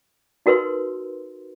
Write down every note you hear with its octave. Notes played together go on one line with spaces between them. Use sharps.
D#4 F#4 A#4 B4 C6